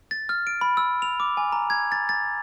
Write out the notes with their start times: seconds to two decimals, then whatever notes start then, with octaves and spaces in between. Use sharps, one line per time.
0.11 A6
0.29 F6
0.47 D7
0.61 B5
0.77 E6
1.02 F7
1.20 D6
1.37 G#5
1.52 A#5
1.70 G#6
1.92 A6
2.09 A6